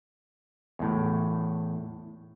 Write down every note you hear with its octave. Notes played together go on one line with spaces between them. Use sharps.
E2 A2